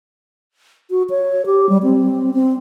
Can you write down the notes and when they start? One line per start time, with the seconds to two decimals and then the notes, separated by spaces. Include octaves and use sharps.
0.90 F#4
1.10 C#5
1.46 G4
1.69 G3
1.83 C4
2.34 C4